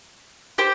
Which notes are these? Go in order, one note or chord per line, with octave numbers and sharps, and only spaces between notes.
G4 C5